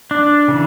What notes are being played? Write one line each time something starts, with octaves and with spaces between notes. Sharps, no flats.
D4
C#3 E3